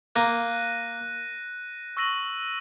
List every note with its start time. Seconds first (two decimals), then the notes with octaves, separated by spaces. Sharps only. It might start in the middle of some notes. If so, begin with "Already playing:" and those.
0.15 A#3 F#6 A#6 D#7
1.97 C#6 E6 A#6 D#7 F#7